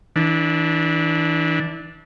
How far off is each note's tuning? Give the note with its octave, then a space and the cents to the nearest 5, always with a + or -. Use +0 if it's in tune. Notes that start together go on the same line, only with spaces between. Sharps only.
E3 -30 D4 +0